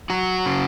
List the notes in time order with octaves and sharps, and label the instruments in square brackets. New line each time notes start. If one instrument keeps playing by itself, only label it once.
[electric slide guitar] F#3 F#4
C#3